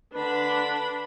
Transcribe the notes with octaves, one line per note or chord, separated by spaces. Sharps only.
D3 D4 B4 B5